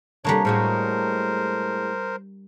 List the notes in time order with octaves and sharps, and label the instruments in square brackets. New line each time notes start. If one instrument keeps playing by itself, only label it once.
[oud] C3 [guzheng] G3 A#3 D4 [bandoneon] C#5
[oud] A2 G#3 F#4 [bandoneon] A#4 C5